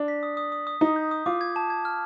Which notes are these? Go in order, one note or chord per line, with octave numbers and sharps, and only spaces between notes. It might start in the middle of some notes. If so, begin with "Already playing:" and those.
Already playing: D4
B6
D#6
D#6
D#6
D#6
D#4 D#6
G6
D#6
F4 D6
G#6
A5
G#6
F6